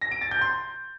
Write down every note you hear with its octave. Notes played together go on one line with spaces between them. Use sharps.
A#6
D7
A6
G6
C6